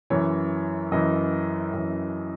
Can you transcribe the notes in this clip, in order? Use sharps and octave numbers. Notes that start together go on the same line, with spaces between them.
F#2 E3 C#5
F#2 E3 D#5
F#2 E3